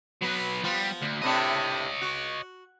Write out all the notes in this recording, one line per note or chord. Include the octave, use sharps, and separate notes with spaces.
F#3 B3 B4
F3 G3 B3 F4
D2
A2 C3 D4 C#5 D#5
F#4